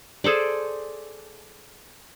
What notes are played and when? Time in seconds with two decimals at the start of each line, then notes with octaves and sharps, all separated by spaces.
0.24 G#4 A4 C5 D5